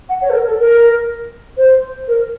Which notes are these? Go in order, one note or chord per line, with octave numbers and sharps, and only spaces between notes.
F#5
C#5
A4
A#4
A4
A#4
C5
A#4